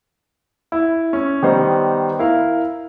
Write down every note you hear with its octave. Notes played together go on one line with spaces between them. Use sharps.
E4
C#4
D#3 G3 B3 D#4 C5
E4 A#4 F5